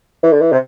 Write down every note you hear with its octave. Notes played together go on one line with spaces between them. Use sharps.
E3
D3
E3
C3